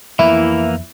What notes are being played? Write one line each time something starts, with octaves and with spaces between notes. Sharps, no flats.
F2 E3 A#3 B3 E4